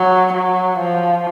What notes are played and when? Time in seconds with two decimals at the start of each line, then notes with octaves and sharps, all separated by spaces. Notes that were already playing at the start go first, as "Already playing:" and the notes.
Already playing: F#3
0.33 F#3
0.79 F3